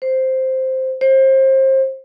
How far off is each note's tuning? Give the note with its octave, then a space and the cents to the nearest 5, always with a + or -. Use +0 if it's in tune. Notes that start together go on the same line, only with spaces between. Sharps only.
C5 +0
C5 +30